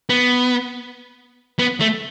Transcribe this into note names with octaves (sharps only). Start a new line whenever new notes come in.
B3
B3
A3